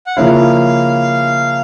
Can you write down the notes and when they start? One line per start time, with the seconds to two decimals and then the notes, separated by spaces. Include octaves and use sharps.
0.07 F#5
0.16 C#3 F3 A#3 C#4 E4 F5